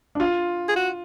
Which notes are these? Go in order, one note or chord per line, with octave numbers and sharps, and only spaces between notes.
D4
F4
G#4
F#4